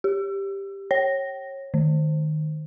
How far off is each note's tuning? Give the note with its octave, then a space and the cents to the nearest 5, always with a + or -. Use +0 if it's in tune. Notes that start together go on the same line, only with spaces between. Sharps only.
G4 +10
C#5 -25
D#3 -15